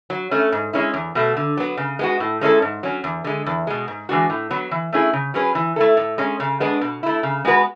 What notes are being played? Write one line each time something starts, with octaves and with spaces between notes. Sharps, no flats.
F#3
A3 C#4
G#2
G#3 C#4 E4
E2
B2 A3
D3
F#3 B3
C#3
G#3 B3 F#4
A2
G#3 C#4 E4 A4
G#2
F#3 C#4
E2
D3 G#3
E2
B2 G#3
G#2
E3 G#3 D4 F#4
A2
F#3 B3
E3
A3 C#4 E4 G#4
C#3
F#3 C#4 G#4 B4
E3
A3 E4 A4
A2
G#3 C#4
C#3
G#3 B3 D4
B2
A3 E4
C#3
G#3 B3 F#4 B4